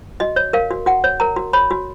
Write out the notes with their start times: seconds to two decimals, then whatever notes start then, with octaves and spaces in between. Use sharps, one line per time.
0.20 F#4 D#5
0.36 C#5
0.53 A#4 F5
0.71 F#4
0.86 F#4 F#5
1.04 C#5
1.20 A#4 A#5
1.36 F#4
1.53 C#5 B5
1.71 F#4